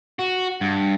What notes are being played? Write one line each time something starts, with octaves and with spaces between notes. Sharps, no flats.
F#4
G2